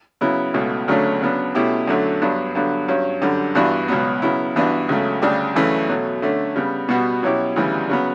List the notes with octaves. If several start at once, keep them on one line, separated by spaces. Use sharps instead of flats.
C#3 F#3 B3 E4
C#2 B2 A3
D2 C#3 F#3 A3 D4
C#3 F#3 B3 D4
B2 A3 C#4 E4 G4
F#2 D3 F#3 A3
G2 F#3 B3 D4
G2 D3 F#3 B3
G2 F#3 C#4
F#2 D3 G3
G2 E3 B3 D4 F#4
C#2 B2 F#3 B3
C#3 F#3 B3 E4
G2 E3 B3 D4 F#4
C#2 C#3 F#3 A3
D2 C#3 G3 D4 G4
F#2 C#3 E3 A3 C#4
B2 F#3 A3
D3 A3 C#4
C#3 G3 B3
B2 G3 B3 F#4
B2 F#3 C#4 E4 G4
D2 C#3 E3 G3
C#3 F#3 B3